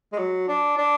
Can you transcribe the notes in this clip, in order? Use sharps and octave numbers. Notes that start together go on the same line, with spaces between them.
G#3
F#3
D4
D4